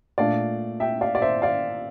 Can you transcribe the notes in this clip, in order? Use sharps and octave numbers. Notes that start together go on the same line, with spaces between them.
A#2 A3 D4 D5 F5
E5 G5
D5 F5
D5
C5 E5
D5 F5